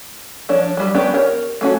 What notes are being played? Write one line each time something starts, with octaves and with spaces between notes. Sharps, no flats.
F3 D4 C#5
F#3 G3
B3 C#4 D4 G4
A#4 C#5
A3 C#4 F#4